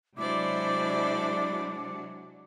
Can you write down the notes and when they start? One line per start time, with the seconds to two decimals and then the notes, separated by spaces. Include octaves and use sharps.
0.17 C3 F#3 G#3 D4 E4 C5 D5 D6